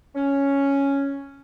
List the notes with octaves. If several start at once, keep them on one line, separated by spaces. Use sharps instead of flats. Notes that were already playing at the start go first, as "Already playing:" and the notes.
C#4